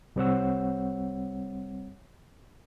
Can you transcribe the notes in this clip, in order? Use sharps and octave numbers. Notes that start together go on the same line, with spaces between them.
C2 G3 C4 C#5 F#5 E6